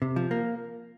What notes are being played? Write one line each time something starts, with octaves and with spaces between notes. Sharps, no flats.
C3
F3
A#3